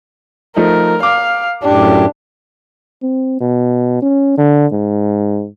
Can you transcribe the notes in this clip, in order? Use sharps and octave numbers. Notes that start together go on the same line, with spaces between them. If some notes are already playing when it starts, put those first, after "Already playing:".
F3 A3 D#4 A#4
F5 D6
F#2 A2 D4 G4
C4
B2
C#4
D3
G#2